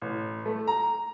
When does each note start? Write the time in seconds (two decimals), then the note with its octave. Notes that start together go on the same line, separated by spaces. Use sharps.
0.02 A1
0.45 A3
0.68 A#5